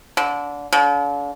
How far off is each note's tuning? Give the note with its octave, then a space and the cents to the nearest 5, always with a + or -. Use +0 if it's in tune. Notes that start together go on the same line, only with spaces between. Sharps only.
D3 -25
D3 -45